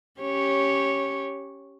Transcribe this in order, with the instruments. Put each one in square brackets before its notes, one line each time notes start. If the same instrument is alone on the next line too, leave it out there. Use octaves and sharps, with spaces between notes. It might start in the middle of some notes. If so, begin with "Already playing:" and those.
[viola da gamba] C#4 G4 C#5